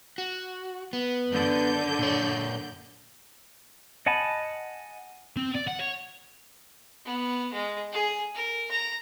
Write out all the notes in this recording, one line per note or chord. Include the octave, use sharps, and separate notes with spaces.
F#4
B3
F#2 D3 G6
A#2 C#5
D#5 F#5 G#5 A5 B5
C4
D5
F#5
C#5
B3
G#3
G#4
A#4
A#5